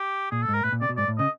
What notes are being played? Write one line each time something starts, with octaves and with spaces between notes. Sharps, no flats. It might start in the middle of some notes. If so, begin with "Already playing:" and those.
Already playing: G4
A#2 G#4
A4
G#2
A#4
A2 B4
A#2
C3 D5
B2
G#2 D5
A2
C#3 D#5